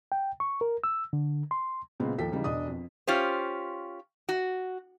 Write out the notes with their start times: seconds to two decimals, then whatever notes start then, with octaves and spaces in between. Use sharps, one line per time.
0.12 G5
0.40 C#6
0.61 A#4
0.84 E6
1.13 D3
1.51 C6
2.00 A#2 C#3 G#3 B3 C4
2.18 D#2 F3 A4 G5 B6
2.32 C#3 E3 G3 D#4
2.44 E1 D4 D#5 D#6
2.68 F2
3.07 C#4 F4 G4 C5
4.29 F#4